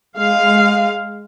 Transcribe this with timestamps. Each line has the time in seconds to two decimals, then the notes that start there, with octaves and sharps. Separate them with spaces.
0.18 G#3 F5